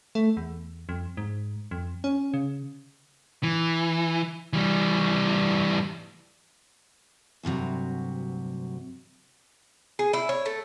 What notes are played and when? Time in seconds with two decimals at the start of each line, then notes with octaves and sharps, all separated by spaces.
0.15 A3
0.37 E2
0.89 F2
1.17 G#2
1.71 F2
2.04 C#4
2.34 C#3
3.43 E3
4.53 E3 G3
7.43 D2 G2 C3 F#3
9.99 G#4
10.13 E4
10.29 C#5
10.46 A3